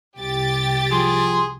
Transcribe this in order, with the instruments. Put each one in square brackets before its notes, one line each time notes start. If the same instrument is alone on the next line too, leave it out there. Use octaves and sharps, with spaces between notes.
[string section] C2 G4 A6
[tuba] F3 [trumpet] G#4 [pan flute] C6